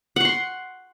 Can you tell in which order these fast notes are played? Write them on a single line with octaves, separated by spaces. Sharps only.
F#5 C#6 C6